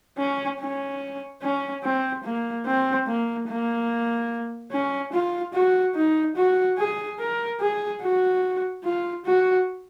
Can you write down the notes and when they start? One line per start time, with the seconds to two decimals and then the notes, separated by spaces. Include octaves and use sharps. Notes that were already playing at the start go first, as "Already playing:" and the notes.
0.18 C#4
0.60 C#4
1.42 C#4
1.84 C4
2.24 A#3
2.66 C4
3.08 A#3
3.48 A#3
4.72 C#4
5.13 F4
5.54 F#4
5.95 D#4
6.36 F#4
6.78 G#4
7.19 A#4
7.61 G#4
8.02 F#4
8.84 F4
9.25 F#4